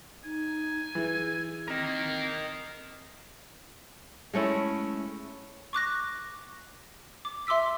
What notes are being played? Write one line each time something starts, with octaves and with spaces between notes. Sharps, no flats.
D#4 G#5
E3 G#4
A#3 C4 A#4 D#5
G#3 A3 C#4 E4
C#6 D6 F#6 A#6
D6
E5 C6 D6 E6 B6